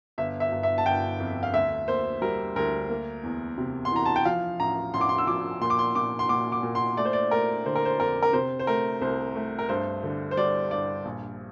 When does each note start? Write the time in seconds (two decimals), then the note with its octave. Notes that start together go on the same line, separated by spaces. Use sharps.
0.18 G1 E5
0.40 E5
0.52 G1
0.63 E5
0.78 A5
0.85 G1 G5
1.20 F2
1.43 F5
1.54 D2 E5
1.88 A#3 C5
2.22 G3 A#4
2.56 D2 A#4
2.89 A#3
3.23 E2
3.58 C3
3.85 C6
3.91 E3 A#5
4.06 A5
4.16 G5
4.25 F3 F5
4.60 A1 A#5
4.94 A1 C6
5.01 D6
5.09 C6
5.18 E6
5.27 F3 D6
5.61 A#2 C6
5.70 D6
5.79 C6
5.95 A#2 D6
6.19 C6
6.29 A#2 D6
6.52 D6
6.63 A#2
6.75 C6
6.97 A3 D5
7.05 C5
7.13 D5
7.31 A3 A#4
7.66 D3 C5
7.75 A#4
7.85 C5
7.99 F2 A#4
8.22 A#4
8.33 C3 C5
8.59 C5
8.67 A3 A#4
9.01 C2 C5
9.35 A3
9.59 A#4
9.69 G2 C5
10.03 D3
10.31 C5
10.37 G3 D5
10.71 G2 D5
11.05 A#1